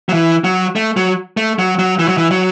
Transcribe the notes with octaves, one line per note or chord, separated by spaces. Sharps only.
F#3
E3
F#3
A3
F#3
A3
F#3
F#3
E3
F#3
E3
F#3